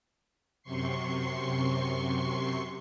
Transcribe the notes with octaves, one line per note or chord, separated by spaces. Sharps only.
F#2 C3 C6 C#6 C7